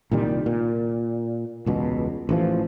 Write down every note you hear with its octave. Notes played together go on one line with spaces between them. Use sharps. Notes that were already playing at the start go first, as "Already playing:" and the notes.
C2 A#2 D#3 G3
A#2
E1 C#2 B2
A1 E3 F3